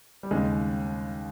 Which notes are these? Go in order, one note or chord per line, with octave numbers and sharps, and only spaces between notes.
G3
D#2 C#3 G#3